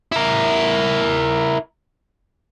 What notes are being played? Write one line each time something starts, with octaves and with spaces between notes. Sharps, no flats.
E4 A#4